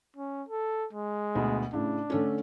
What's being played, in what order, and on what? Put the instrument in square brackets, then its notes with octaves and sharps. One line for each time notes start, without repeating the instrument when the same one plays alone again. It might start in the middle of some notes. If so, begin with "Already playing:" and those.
[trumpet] C#4
A4
G#3
[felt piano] D2 B2
[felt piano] A2 C#3 [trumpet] D4
[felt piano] D3 A3 C#4